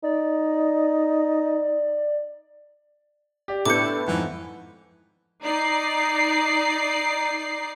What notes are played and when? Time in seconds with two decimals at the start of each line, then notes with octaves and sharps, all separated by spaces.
0.04 D#4 D5
3.48 G4 D5
3.66 A2 B3 D4 E4 D6 G6 C#7
4.08 F2 G#2 E3
5.44 D#4 D5 C7